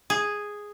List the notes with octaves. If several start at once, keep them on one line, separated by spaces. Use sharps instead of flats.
G#4